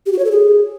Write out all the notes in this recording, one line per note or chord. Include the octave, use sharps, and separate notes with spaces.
G4
F#4
C#5
A4
G#4